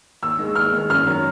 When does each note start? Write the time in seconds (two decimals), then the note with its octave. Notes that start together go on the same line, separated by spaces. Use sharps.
0.22 D#2 E6
0.39 D#3 G#3
0.56 D#2 F6
0.73 D#3 G#3
0.89 F#2 F6
1.07 D#3 F#3